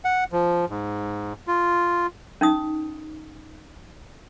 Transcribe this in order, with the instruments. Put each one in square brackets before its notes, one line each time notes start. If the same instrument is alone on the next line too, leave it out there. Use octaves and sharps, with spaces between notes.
[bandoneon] F#5
F3
G#2
F4
[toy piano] C#4 D#4 D#6